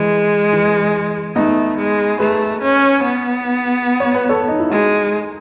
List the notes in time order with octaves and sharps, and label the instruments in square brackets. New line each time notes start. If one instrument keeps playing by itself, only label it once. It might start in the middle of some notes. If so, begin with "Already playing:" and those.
Already playing: [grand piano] E3 [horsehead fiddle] G#3
[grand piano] E3
[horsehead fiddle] A3 [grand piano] B3 D#4
[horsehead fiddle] G#3
[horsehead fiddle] A3 [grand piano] G#4 B4
[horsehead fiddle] C#4
B3
[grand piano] C#5
B4
A4 C#5
D#4
E4
[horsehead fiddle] G#3 [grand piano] D#4 F#4